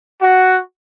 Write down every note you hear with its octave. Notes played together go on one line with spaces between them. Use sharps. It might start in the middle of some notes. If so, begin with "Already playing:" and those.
F#4